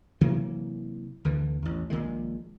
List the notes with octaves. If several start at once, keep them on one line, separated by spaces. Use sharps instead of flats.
C3 E3 F#3 A#3
D2 D3 E3
A1 E2
A#1 A#2 D#3 G#3